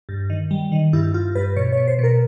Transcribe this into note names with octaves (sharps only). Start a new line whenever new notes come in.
G2
D#3
G3
D#3
G2 E4
G2 F4
G2 B4
B2 C#5
C#5
B2
C5
B2 A#4